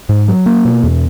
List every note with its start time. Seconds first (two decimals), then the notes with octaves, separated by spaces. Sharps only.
0.09 G#2
0.28 F#3
0.46 A#3
0.65 B2
0.83 E2